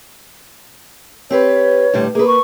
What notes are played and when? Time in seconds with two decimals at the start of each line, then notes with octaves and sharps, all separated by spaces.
1.30 C4 G4 B4 C#5
1.93 A2 D3 G3
2.15 A#3 G#4 B4
2.27 C#6